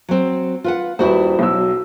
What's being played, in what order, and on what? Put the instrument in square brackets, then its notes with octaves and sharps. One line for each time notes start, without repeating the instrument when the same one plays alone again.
[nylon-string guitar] F#3 C4
F4 B4 F#5
[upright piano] D#1 B4 [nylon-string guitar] E4 F#4 C5
[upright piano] B1 F#3 E6